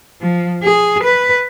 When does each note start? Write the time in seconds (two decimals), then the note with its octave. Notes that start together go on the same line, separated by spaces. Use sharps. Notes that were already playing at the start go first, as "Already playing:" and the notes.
0.22 F3
0.63 G#4
1.04 B4